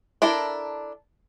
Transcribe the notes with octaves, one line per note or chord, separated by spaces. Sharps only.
D4 E4 A4 A#4